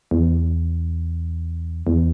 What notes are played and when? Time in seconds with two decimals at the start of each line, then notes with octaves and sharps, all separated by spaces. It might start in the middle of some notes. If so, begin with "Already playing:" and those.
0.11 E2
1.87 E2